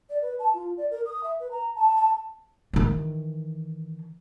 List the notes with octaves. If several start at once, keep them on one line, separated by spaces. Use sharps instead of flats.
D5
B4
A5
F4
D5
A#4
D#6
E5
B4
A#5
A5
A5
D#3 E3